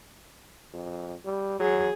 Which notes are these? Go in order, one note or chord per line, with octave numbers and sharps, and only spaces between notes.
F2
G3
F#3 G#4